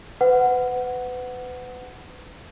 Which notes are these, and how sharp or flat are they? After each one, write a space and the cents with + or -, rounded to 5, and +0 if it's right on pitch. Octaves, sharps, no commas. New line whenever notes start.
B4 +30 F#5 +0